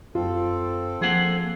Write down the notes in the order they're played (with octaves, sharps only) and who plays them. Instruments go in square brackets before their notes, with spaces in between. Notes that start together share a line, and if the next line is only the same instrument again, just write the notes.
[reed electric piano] F#2 [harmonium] C4 A4 [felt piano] F4
[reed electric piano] F3 A#3 [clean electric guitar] G#4 F#5